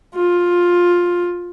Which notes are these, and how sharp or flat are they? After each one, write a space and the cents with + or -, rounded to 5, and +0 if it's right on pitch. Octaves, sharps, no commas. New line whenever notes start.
F4 +10